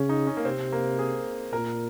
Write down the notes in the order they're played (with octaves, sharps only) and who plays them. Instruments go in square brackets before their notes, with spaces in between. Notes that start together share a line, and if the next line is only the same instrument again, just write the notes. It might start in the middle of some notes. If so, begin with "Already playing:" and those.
Already playing: [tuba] C#3 [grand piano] C#4
[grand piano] D#4
C#4
A#3
[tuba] C3 [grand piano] C4
[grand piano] A#3
G#4
[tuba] A#2 [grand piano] A#4